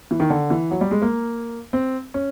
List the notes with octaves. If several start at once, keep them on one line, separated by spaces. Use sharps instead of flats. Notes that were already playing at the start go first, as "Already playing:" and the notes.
E3
D#3
D3
E3
F#3
G3
G#3
A#3
C4
C#4